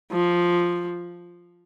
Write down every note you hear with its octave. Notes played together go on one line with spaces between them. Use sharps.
F3